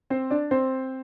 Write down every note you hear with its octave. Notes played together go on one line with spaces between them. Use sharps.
C4 C5
D4 D5
C4 C5